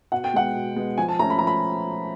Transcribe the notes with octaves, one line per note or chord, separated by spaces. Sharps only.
B2 F#5
G5
G#3 B3 F#5
B2
G#3 B3
F3 G#5
A5
A3 C#4 A#5
B5
F3 A#5
B5